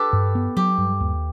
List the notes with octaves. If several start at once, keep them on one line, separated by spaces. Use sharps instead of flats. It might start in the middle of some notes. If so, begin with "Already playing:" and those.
Already playing: G4 A4 B4
G2
B3
F#3 G4
G2
D#2